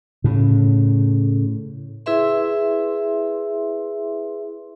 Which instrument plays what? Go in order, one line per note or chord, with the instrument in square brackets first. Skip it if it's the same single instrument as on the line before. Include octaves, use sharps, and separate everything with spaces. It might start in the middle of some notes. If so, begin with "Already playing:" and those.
[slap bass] A2 C#3
[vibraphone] E4 G#4 B4 E5 C6